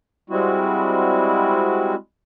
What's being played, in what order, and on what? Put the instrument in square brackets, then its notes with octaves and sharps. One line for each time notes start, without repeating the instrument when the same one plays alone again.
[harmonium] G3 G#3 C4 E4 F#4